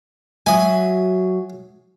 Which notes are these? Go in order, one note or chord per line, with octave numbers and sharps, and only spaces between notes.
F#3 F#4 E5 G#5 D#6